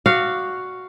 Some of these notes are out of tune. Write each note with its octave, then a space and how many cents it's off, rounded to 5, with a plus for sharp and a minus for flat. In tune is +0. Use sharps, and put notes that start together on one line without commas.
F#4 +0 D5 +20 F5 -10